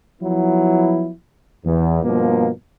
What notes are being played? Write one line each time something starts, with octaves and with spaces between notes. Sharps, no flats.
F3 F#3 B3 E4
E2
G2 B2 F3 A#3